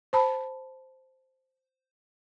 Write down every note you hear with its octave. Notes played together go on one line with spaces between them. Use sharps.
C5 A5 B5